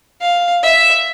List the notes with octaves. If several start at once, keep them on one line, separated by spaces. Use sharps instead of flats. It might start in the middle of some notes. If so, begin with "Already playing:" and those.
F5
E5